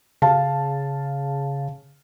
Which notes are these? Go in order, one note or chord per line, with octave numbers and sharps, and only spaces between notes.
C#3 F5 A5